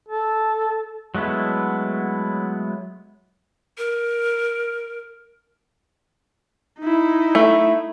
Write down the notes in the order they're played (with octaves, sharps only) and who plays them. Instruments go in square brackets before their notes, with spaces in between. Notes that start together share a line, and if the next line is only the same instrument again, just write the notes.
[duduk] A4
[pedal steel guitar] F#3 G#3 A3 B3 E4
[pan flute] A#4
[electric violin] D#4 E4
[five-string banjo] A3